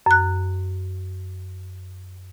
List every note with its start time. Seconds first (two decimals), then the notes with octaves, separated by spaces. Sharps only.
0.06 F#2 F#6